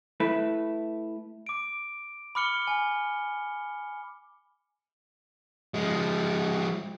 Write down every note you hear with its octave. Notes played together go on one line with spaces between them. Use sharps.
A3 E4 B4
D6 D7
B5 D6 F6 C#7 G7
G#5
F3 G#3